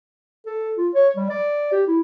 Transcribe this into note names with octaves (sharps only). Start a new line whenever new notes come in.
A4
F4
C#5
G3
D5
G4
E4